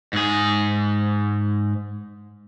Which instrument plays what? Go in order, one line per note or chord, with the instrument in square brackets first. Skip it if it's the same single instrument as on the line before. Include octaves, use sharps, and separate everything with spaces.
[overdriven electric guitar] G#2 G#4